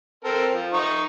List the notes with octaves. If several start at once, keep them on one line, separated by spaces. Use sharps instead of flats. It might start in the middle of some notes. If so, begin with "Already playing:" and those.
C4 A4 A#4
F3
D#4 C#6